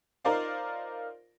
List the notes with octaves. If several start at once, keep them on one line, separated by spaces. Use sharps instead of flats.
D#4 F4 A#4 C5 D5 F5